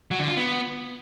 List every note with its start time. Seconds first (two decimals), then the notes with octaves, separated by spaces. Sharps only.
0.11 F#3
0.19 D3
0.28 F4
0.37 B3